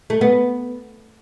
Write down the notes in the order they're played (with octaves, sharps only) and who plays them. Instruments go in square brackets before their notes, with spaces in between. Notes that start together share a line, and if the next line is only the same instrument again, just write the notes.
[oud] A3
B3